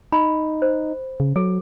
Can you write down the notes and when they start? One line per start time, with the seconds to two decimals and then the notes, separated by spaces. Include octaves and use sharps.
0.12 D#4 B5
0.62 C5
1.20 C#3
1.36 F#3 A4